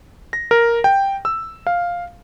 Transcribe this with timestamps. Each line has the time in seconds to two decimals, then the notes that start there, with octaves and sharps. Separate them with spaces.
0.33 A#6
0.51 A#4
0.84 G5
1.25 E6
1.67 F5